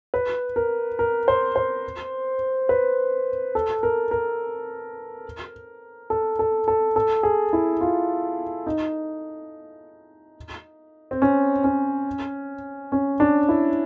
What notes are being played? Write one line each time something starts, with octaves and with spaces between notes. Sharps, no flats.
B4
A#4
A#4
C5
C5
B4
A4
A#4
A#4
A4
A4
A4
A4
G#4
E4
F4
D#4
C4
C#4
C#4
C#4
D4
E4